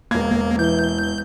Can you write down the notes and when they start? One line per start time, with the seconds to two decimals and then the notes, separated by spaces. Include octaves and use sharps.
0.11 E1 A#3 G#6
0.59 E3 G6